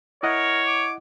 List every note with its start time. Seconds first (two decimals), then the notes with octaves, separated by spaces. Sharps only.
0.23 E4 A#4 C#5 D#5 F#5
0.66 D6